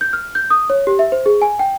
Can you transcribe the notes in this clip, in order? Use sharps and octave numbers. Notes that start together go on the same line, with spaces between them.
G6
F6
G6
D#6
C#5
G4
E5
C5
G#4
G#5
G5